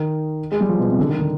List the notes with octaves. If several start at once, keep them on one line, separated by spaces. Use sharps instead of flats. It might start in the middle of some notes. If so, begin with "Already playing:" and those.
Already playing: D#3
G#3
G3
F3
B2
C3
D3
D#3
D3